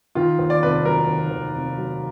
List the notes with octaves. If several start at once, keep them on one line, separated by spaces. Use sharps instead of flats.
D#3 F4
D#2
D5
F1 B4
D5
F#3 A#4
D#3
D#2
F1
F#3